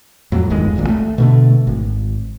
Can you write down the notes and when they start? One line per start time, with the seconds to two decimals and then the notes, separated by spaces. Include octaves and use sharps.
0.32 F2 A2 F#3
0.50 D1 G1 D#2 G#3
0.76 D#1 A#1 D#2 A#2
0.88 A3
1.18 B2 D3 A3
1.67 G#1